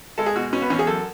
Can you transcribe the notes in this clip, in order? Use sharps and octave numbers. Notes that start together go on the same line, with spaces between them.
G#3 A4
G#4
B2 F#4
B2 C#4
B3
E2 C#4
G#4
F#2 A4